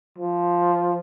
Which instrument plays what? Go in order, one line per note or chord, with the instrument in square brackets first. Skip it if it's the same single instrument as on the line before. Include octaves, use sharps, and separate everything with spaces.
[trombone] F3